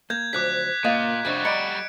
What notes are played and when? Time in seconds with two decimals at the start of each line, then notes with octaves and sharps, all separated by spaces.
0.10 A#3 G6 G#6
0.33 D2 F3 F#3 D6 F#6 B6
0.85 C#2 A#2 A#3 D#5 F5 D#6
1.25 F2 C3 G3 D4 F#4
1.45 D5 D#5 A#5 B5 C#7 D7